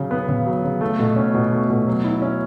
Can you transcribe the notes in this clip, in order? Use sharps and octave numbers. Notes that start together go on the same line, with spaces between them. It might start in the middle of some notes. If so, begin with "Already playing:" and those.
Already playing: C#3 F#3
B3
C#3
F#3
C#3
A3
B2
C#4
B2
A3
B2
F#3
E4
C#4